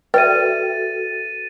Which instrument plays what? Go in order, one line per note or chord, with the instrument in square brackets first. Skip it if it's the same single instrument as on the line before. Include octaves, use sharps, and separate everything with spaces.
[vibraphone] F#4 A4 [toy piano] B4 D5 E5 [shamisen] G5 [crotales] A6 D#7